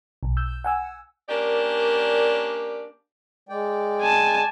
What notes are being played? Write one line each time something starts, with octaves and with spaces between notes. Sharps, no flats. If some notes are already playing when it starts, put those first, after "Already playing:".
B1
E6 G6
F#5 G#5 E6
A#3 C#4 D4 G4 A#4 D5
G#3 D5 G5
G#5 A5